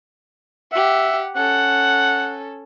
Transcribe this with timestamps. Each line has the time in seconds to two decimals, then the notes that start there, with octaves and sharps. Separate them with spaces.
0.72 G4 E5 F#5
1.36 C#4 A4 F#5